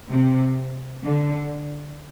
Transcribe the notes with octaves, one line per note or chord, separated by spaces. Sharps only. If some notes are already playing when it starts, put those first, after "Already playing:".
C3
D3